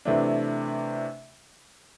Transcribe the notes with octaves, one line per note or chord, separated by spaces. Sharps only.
C3 E3 A3 D4